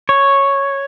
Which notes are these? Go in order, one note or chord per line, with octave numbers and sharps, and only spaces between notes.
C#5